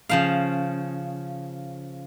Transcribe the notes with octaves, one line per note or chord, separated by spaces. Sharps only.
C#3 F3 F5